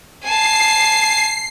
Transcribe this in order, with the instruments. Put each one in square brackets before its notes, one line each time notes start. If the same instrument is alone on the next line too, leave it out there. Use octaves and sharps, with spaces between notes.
[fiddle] G#5 A5 [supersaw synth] C7